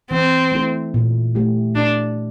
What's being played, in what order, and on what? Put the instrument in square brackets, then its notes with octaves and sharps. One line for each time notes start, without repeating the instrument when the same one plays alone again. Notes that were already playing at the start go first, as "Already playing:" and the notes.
[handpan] E3 [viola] C4
[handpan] A3 E4 A4
A#2
A3 E4 G4
[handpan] A#2 [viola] D4